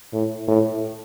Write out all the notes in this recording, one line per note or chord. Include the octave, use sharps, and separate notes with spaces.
A2
A2